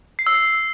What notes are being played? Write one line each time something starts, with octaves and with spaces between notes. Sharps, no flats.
C7
E6
C7